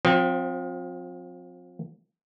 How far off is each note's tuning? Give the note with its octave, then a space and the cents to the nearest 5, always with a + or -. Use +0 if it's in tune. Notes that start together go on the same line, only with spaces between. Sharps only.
F3 +30 C4 +0